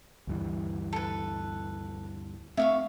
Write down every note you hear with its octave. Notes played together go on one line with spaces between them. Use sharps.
D2 G2 E3
A4 B4
A3 C4 E5 F5 C#6